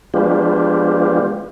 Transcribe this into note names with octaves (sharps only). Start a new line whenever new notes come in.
F3 G#3 B3 D4 F4 G4